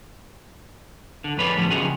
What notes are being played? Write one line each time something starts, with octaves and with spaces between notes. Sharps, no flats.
D3
F2 G#2 B4 C#5 D5
A2 D3 F3 G3 B3
C#3 F3 C#4 D#4 F#4 G#4